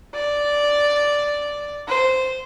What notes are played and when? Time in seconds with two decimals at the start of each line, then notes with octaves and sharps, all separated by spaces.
0.14 D5
1.88 C5